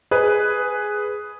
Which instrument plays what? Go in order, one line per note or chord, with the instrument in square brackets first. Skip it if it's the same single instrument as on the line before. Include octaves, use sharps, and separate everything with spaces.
[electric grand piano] G#4 [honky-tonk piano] B4